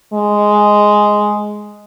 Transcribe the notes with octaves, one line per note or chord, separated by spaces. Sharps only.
G#3